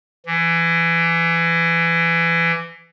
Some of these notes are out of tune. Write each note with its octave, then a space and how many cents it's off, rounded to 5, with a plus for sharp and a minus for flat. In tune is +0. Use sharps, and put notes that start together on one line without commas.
E3 +25